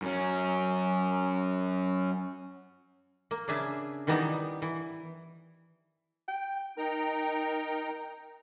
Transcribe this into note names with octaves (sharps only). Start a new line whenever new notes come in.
F#2 C#4
A#3
C#3 D4 G#4 E5
D#3 E3 G3 B3 D#4
E3
G5
D#4 A#4 G5 A#5